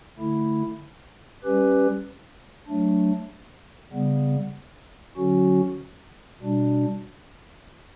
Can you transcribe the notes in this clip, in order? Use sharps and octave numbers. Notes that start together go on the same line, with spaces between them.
D3 A3 E4
G3 C#4 G4 B4
F#3 A3 D4
C#3 G3 B3
D3 F#3 C#4 F#4
B2 G3 D4